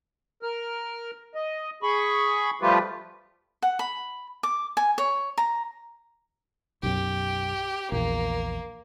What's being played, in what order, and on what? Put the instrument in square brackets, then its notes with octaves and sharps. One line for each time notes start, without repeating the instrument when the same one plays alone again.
[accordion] A#4 F6
D#5
G#4 B5 C#6
F3 G3 A3 F4 G4 B4
[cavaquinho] F#5
B5
D6
G#5
C#5
A#5
[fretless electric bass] B1 F#2 [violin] G4
[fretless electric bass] A#1 E2 [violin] A#3